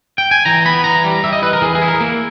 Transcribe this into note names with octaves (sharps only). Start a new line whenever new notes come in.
G5
G#5
E3 A#5
B3 B5
E3 A#5
G3
G3 E5
D#5
E3 B4
A#4
E3 G#4
G#4
E4
A#4
A#3